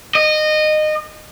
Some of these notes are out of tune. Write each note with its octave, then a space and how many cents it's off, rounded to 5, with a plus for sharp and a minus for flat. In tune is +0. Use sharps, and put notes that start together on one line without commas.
D#5 -20